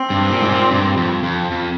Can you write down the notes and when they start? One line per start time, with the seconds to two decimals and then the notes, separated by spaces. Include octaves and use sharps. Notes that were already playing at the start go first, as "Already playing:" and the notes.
Already playing: C4
0.10 G2
0.30 A#2
0.41 G#2
0.50 A#2
0.71 G2
0.97 F2
1.23 F2
1.51 F2